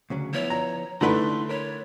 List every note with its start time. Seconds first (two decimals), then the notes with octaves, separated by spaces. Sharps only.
0.10 D2 C#3 F#3
0.34 F3 B3 E4 C#5
0.50 A#5
1.01 D3 A3 D#4 E4 B4 A#5 C6
1.49 A#4 C#5 B5